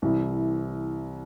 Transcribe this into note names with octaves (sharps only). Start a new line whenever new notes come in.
C2 C3 E3 G3 E4